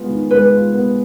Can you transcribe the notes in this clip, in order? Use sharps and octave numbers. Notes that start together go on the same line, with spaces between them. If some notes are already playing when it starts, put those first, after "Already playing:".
Already playing: G#3 B3 F4
D#3
G#3 B4
F4
B3